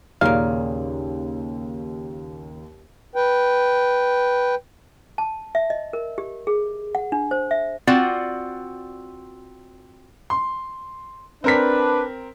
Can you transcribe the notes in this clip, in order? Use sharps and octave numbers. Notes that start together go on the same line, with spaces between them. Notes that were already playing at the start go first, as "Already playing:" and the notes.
D#2 A#2 C#3 A#4 F5
B4 G5
A5
E5
D#5
A#4
G4
G#4
F#5
D4
C5
E5
C4 F4 F#4 D5 F#5
C6
C4 D4 A#4 B4 B6